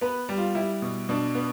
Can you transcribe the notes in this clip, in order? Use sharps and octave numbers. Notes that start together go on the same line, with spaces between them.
B3 B4
G3
F4
G3 E4
B2
B2 D4
B3